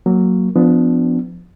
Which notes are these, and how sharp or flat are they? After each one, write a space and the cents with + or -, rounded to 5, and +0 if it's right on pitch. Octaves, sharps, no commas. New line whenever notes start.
F#3 +0 A#3 -10
F3 +0 B3 +25 D4 +0